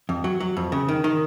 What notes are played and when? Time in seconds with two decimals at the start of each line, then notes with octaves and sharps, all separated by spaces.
0.09 F2
0.24 F#3
0.40 F#3
0.57 F2
0.72 C#3
0.88 D#3
1.04 D#3